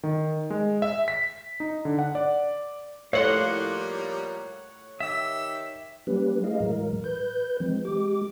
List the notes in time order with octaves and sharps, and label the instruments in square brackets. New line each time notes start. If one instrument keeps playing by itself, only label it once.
[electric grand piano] D#3
G#3
E5
B6
D#4
D3
F#5
D5
[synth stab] A2 F#5 [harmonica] F3 G3 A#3 [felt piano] C#5 [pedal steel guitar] F5 C6
[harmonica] D#3 G4 E6 [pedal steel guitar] E5
[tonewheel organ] F#3 G3 A#3 C#4 G4 B4
A3 E4 G#4 D#5 F5
A2 E3 F#3 G#3 A#4
B4 G6
E3 F3 G#3 C4
G#3 G4 D6